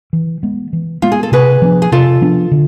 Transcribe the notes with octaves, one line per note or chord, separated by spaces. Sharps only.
E3
G#3 B3
E3
G#3 B3 F4
G#4
A4
C3 G#4 B4
F3 B3 D4
G#4
C3 F4 A4
F3 B3 D4
D3